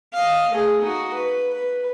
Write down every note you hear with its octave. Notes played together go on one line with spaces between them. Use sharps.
D#5 F5
A3 G#4
D#4 F#4
B4
B4